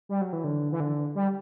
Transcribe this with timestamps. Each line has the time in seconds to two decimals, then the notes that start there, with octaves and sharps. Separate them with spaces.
0.09 G3
0.21 F#3
0.33 E3
0.44 D3
0.72 E3
0.80 D3
1.15 G3